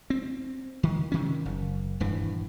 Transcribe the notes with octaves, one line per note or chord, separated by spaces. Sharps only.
C4
D#3
C3 D#3 C#4
F#1
D#1 G2 E3